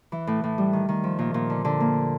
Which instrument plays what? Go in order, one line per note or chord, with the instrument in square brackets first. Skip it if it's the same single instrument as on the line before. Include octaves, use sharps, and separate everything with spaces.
[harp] E3
A2
A2
G3
D#3
D#3
F3
A#2
A#2
D3
D3
A#3